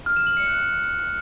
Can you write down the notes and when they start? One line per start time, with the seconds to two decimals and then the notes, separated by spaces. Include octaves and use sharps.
0.06 F6
0.16 E7
0.27 F#7
0.37 C#7
0.47 F#6